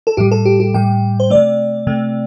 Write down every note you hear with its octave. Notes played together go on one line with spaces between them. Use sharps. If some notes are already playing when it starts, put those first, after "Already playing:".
A4
A2 G3 G4
A4
G4
G4
A2 G3 G5
C5
C3 A3 D5
C3 A3